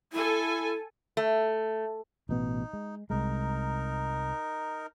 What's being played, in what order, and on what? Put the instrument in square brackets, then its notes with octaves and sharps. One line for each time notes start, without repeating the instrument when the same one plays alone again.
[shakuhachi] E4 [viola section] A4 G#5
[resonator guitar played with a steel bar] A3
[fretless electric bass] A1 B2 B3 [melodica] D#4
[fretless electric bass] G#3
[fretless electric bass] C2 G#3 [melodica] D#4 A#4